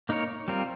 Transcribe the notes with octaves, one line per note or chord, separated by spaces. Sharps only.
A#3 D#4 A#4 C#5
G3 C4 F4 A#4